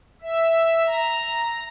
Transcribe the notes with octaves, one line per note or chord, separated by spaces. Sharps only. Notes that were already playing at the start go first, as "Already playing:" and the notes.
E5
A#5